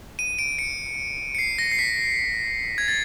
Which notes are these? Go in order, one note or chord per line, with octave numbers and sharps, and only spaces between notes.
D#7
D7
C#7
C#7
C7
A#6
C7
B6
G#6
A6